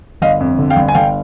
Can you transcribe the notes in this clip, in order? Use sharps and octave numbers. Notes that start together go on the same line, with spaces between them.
G1 D#5 F5
F2
D3
F5 G5
G1
G#5
G1 F5 G5